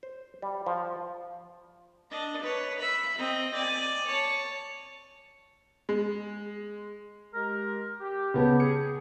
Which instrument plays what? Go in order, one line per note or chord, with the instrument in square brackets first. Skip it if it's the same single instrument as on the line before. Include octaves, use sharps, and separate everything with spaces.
[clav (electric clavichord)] C5
G3
F3
[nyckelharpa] D4 D#5
B4 C#5
E5 B5
C4 D#5
D5 G#5
C#5 A5
[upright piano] G#3
[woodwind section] G#3 G4 A#4
G4
[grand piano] C#3 B3 A5
[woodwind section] G#4 [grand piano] C#7